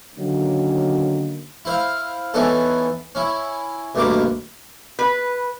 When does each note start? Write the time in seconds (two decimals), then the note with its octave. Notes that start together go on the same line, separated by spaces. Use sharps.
0.16 D3 D#3 F#3 A#3 C#4
1.65 E4 C5 F5
2.34 E3 B3 C#4 D#4 A4
3.15 C#4 E4
3.95 D2 G2 B2 D#3 A#3 D6
4.99 B4